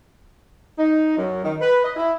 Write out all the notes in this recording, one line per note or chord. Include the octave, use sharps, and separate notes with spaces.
D#4
F#2
D#3
B4
D#5
E4